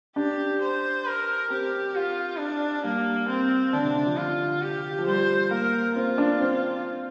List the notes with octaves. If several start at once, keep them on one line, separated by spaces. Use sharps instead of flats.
D4 G4
C5
A#4
C4 G4
F4
D4
G3 A#3
C4
D3 D4
C3
D3
F3
F4
G4
F3
G3 C5
A#3 A#4
C4 F4
D4
C4